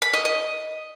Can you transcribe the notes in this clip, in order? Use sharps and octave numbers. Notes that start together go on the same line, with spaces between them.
B5
D#5
D#5